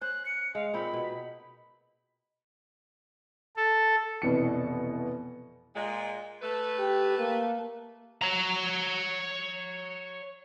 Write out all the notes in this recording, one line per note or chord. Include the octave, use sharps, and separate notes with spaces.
C#4 C5 F#6
C#7
G#3 F5
A#2 C4 D#4 B5
B2
A4
F1 B2 E3 C#7
A#2 G#3
A3 B4
G4
A#3
C#5 A#5